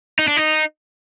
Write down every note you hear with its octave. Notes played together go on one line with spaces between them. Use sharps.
D#4
D4
D#4